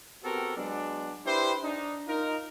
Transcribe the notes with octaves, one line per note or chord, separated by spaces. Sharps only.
B3 C4 F#4 G4 A4 A#4
F#3 G#3 B3 D4
D4 E4 G4 B4 C5
D4 D#4
D#4 F4 A#4